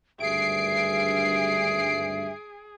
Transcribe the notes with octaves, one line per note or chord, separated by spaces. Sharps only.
G#1 D2 G2 G#4 E5 C7 D7